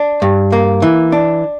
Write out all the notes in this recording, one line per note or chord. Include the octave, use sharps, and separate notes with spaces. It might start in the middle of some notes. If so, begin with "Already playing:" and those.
Already playing: D4
G2
A#3
E3
D4